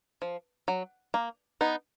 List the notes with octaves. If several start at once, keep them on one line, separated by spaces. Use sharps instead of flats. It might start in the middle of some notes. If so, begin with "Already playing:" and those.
F3
F#3
A#3
B3 D#4